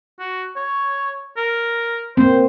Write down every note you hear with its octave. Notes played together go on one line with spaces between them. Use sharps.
F#4
C#5
A#4
A#3 C4 C5